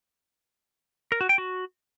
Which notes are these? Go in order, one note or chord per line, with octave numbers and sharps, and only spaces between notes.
A#4
F#4
G5
F#4